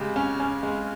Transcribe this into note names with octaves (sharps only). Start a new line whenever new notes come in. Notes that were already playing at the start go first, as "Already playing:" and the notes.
Already playing: C#3 G#3 G4
C#4
C#4
G#3